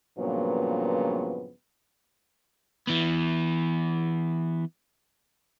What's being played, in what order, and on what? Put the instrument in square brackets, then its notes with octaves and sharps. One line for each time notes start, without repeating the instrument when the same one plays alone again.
[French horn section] G2 A#2 C#3 F3 F#3 B3
[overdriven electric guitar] E3 B3